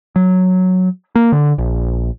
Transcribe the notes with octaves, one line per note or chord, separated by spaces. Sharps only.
F#3
A#3
D3
A#1